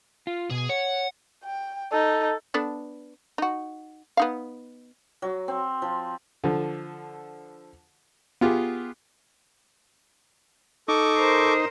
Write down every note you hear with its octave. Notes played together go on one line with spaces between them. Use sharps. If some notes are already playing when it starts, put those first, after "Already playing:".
F4
B2 G#4
C#5 F#5
G5
D#4 A4
B3 D4 A4
D#4 F#4
B3 D#4 F5
F#3
C4
F3
D3 F3
B3 F4 G4 G#4
D#4 A4 C#6 D6
A#4 C5